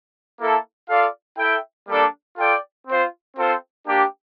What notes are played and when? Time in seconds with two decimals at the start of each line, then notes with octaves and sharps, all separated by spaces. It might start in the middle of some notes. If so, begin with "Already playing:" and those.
0.40 A#3 E4 A4
0.88 F4 A4 D5 F5
1.38 E4 A4 E5 G5
1.88 G3 A#3 D4 A4 D5
2.38 F4 A4 D5 G5
2.87 C4 F4 C5
3.37 C4 F4 A4 C5
3.86 A#3 D4 G4